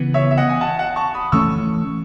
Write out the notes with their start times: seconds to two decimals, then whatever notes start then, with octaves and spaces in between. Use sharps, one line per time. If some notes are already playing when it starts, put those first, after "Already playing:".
Already playing: C#3 E3 B3
0.14 C#5 E5
0.31 E5
0.37 D#5 F#5
0.49 G#5
0.61 F#5 A5
0.79 F#5 A5
0.96 A5 C#6
1.14 B5 D#6
1.32 E3 A3 C#4 C#6 E6